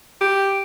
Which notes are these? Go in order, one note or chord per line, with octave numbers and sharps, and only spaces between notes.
G4